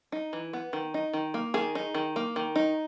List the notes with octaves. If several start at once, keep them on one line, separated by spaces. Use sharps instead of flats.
D#4
E3
B3
D#3
D#4
D#3
A#3
D#3 G#4
D#4
D#3
A#3
D#3
D#4